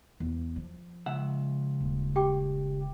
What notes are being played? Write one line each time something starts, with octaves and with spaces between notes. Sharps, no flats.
E2
F3
C#2 E5 F#5
D#1
G4 G5 D6